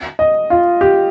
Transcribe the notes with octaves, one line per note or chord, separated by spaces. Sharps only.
D#5
F4
G4